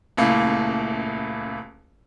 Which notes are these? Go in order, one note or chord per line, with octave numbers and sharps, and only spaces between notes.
D#1 C#2 A3 A#3 E4